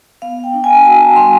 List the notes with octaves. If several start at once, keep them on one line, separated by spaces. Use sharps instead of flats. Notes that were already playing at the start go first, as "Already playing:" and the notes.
B3 F5
G5
D4
G#5
F#4 A5
A#5
G3 C6